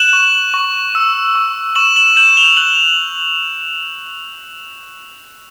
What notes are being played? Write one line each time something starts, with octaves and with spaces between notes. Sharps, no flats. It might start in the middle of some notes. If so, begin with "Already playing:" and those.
Already playing: F#6 E7 F#7
C#6
C#6
E6
C#6
C#6 E7 F#7
E7 F#7
G6 E7 F#7
F7 G7
F#6 E7 F#7